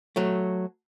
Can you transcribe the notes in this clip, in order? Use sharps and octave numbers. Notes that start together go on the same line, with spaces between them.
F#3 A3